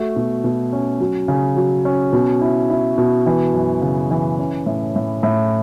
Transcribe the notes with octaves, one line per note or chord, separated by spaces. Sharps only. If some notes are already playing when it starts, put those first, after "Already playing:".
Already playing: A3 F#4
B2
B2
C#4
F#3
C#3
F#3
C#4
B2
E4
E4
B2
E3
F#2
C#3
E3
C#4
A2
A2
A2